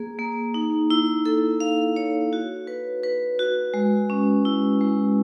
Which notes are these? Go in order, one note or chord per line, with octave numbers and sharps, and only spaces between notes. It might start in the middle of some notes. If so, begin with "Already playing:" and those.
Already playing: A#3 G#4
A#3
D#4
E4
A4
F5
C#5
F#4
B4
B4
F#4
G#3
C#4
E4
G#3